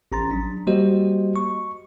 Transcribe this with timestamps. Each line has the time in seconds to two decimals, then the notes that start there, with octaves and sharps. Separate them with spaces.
0.12 A1 C#4 A#5 C6 A6
0.31 F#3 D4
0.67 G3 A#3 F#4 G4 C5 D#5
1.36 C#6